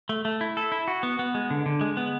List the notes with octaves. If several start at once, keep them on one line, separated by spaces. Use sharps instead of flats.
A3
A3
E4
A4
E4
F#4
B3
B3
G#3
D3
D3
G#3
B3